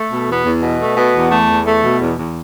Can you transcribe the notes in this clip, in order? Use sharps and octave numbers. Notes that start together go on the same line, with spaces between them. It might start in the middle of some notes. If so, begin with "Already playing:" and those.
Already playing: A3
B2
E2 B3
E2
B2
A3
B2 B3
E2
A3
E2
A3
B2
E2
E2